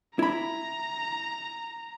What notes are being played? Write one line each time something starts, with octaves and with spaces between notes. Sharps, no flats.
E4 A#5 B5